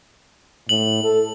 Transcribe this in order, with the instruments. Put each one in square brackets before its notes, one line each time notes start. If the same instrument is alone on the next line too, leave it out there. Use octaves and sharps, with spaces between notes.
[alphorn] A2 [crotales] F#7
[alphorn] A4